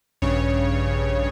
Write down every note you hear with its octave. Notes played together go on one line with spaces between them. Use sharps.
A#1 G2 C#3 C#5